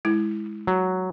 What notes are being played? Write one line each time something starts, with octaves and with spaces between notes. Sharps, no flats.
G#3 E4
F#3